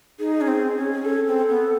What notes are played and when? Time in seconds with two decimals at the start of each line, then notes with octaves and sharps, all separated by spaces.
0.19 D#4 G#4
0.41 C#4
0.48 C4
0.76 C#4
0.93 G#4
1.05 C#4 A4
1.27 C4
1.49 B3